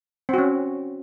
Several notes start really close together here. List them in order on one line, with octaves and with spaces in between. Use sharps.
C4 F#4 C#4